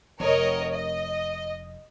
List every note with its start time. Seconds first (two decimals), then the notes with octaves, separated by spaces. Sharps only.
0.20 F1 A#4 C#5 D#5
0.72 D#5